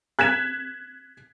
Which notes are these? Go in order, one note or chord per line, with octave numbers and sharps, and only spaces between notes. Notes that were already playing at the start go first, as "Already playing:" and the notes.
F#6 G#6 B6 E7